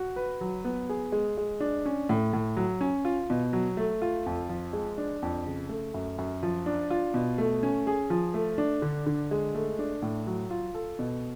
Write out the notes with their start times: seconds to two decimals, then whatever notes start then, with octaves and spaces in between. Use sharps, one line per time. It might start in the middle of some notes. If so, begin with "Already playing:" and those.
Already playing: F#4
0.16 B4
0.41 F#3
0.65 B3
0.89 G#4
1.12 G#3
1.37 G#3
1.60 D4
1.85 C#4
2.09 A2
2.33 A2
2.57 F#3
2.81 C#4
3.05 F4
3.30 B2
3.53 F#3
3.77 A3
4.02 F4
4.26 F2
4.49 F3
4.73 G#3
4.98 D4
5.22 F2
5.46 C#3
5.69 A3
5.94 F#2
6.18 F#2
6.43 F3
6.66 D4
6.90 F4
7.14 B2
7.38 A3
7.63 C#4
7.87 G#4
8.10 F3
8.34 A3
8.58 D4
8.82 D3
9.06 D3
9.31 G#3
9.55 A3
9.79 D4
10.02 A2
10.27 F#3
10.51 F4
10.74 A4
10.99 B2